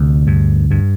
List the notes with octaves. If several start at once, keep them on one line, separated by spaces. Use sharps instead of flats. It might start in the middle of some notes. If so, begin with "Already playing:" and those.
Already playing: D2 C3
G2
G2